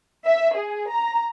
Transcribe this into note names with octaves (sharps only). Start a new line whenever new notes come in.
E5
G#4
A#5